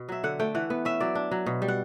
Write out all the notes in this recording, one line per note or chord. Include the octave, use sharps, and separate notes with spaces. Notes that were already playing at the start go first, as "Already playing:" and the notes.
Already playing: B2
F#3 E5
D3 F#5
A3 G5
E3 F#5
B3
C#4 E5
F#3 D5
D4
F#3
B2
G3
F#5